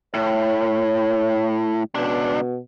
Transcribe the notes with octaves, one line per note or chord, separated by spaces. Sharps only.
A2 C#5
C#2 B2 D4